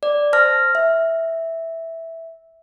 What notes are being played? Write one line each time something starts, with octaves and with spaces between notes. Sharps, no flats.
D5
C5 A5 F6 A#6
E5